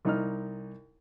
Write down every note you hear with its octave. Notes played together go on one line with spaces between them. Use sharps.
C2 D#4 F6